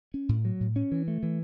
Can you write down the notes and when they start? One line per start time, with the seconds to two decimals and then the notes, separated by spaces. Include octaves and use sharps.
0.14 C#4
0.29 A2
0.45 F#3
0.60 A2
0.76 C#4
0.92 E3
1.08 A3
1.23 E3